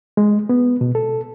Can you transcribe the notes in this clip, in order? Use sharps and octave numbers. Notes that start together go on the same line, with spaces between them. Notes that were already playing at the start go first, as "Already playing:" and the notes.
G#3
B3
B2
A4